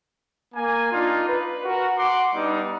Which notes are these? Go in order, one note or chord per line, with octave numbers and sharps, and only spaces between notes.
A#3 G#5
D4 D#4 F4
B4
F#4 A#4
F#5 C6 D6
G3 B3 D4 D#4